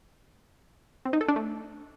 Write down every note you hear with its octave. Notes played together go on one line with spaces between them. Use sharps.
C4
D#4
A4
D4
A3